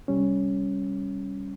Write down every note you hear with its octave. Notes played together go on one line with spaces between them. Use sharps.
C2 G3 C#4